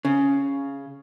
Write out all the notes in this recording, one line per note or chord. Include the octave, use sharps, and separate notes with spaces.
C#3